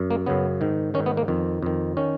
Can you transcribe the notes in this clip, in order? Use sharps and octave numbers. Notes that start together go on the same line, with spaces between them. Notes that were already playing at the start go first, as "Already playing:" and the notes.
Already playing: F#2
A#3
F#2 C#3 B3
G#2 D#3
G#2 D#3 C#4
B3
A#3
F2 D#3
F2 D#3
D#3 C#4